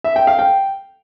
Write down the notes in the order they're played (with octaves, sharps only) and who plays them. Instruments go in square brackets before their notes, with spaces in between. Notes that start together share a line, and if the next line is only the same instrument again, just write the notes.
[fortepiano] E5
G5
F5
G5